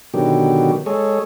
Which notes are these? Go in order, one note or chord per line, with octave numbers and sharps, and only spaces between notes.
B2 D3 D#3 F#3 G4
G#3 G#4 A4 C#5